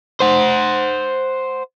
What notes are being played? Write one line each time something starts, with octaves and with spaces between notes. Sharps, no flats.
C5 F#5